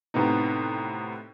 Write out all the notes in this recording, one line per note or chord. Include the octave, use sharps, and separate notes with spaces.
A2 C3 B3 D#4